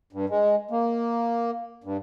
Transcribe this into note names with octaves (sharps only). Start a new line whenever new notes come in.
G2
G#3
A#3
G2